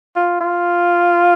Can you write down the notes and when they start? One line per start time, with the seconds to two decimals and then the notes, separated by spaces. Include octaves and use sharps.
0.16 F4
0.41 F4